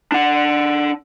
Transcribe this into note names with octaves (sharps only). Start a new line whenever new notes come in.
D4 F#5